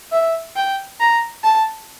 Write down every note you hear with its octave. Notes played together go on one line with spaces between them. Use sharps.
E5
G5
A#5
A5